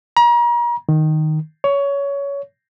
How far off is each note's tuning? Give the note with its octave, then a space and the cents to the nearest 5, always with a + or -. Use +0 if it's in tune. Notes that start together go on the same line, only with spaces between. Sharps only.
A#5 +40
D#3 -5
C#5 +20